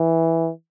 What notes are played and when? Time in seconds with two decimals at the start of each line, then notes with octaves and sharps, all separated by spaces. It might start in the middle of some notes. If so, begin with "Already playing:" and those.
Already playing: E3